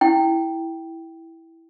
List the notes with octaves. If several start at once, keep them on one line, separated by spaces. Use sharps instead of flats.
E4 G5